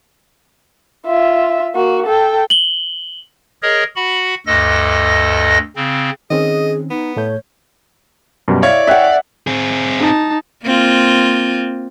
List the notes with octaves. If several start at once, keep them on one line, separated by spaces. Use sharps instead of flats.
F4 E5
A#3 F#4
A4 G5
F#7 G7
G#4 A#4 C#5 D#5
F#4 F#5 B5
D2 G2 A4 D#5 A#6
C#3 C4
D#3 C4 C#4 G#4 D#5
B3 D#4
A2 A3 C#5 G6
F#2 B2 G3
E4 C#5 D5 F5
E5 F#5 G5 F#6 B6
C4 G#4
D#4 A5
A#3 C4 F4